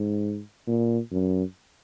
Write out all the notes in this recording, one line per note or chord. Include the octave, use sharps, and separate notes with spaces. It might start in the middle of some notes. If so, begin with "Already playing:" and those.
Already playing: G#2
A#2
F#2